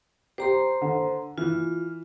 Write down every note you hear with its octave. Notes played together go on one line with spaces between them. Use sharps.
G4 C5 A#5 C6
D3
E3 F4